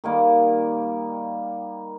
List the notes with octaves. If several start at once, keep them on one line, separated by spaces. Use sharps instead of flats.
D#3 G3 A#3